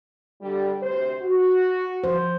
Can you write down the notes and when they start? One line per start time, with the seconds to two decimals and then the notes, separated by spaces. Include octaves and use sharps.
0.42 G2 D3 G3
0.83 D2 C3 C5
1.23 F#4
2.04 F3 C5